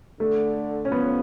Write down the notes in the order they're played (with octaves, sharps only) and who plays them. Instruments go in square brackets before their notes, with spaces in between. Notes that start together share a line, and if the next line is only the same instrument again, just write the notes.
[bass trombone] D3 [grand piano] A3
[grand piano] C#4
[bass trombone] F3 [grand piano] B3